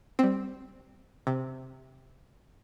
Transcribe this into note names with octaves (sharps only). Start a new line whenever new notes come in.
G3 C4
C3